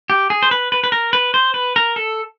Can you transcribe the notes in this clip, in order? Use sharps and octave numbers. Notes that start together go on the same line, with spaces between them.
G4
G#4
C5
B4
B4
B4
A#4
B4
C5
B4
A#4
A4